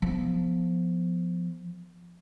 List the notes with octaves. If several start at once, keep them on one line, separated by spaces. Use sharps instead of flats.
F3 B3